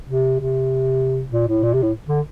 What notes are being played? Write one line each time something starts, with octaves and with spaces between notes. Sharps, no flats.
C3
C3
A#2
A2
A#2
C3
A2
D3